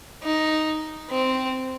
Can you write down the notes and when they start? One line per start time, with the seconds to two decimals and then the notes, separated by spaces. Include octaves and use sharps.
0.23 D#4
1.10 C4